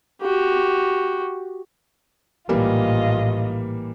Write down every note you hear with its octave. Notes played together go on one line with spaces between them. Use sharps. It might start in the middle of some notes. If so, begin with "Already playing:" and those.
F#4 G4
A#1 A2 E3 G3 A#3 F4 D#5